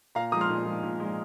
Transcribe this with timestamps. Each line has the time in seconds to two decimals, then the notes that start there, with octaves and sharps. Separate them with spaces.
0.15 A#2 F5 A#5
0.32 F3 G#3 A#5 D#6
0.41 C6 F6
0.49 A#2
0.66 F3 G#3
0.83 A#2
1.00 F3 G#3